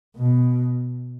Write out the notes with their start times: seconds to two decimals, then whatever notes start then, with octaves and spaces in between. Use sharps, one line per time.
0.16 B2